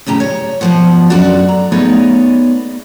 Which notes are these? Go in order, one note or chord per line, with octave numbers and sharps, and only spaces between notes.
D#2 A2 C#3 G4 A#5
C#5
F2 B2 D#3 F3 C5 F#5
F#2 D3 F#4 D5 F#5
A#5
A3 B3 D#4 G#4 C#5 D5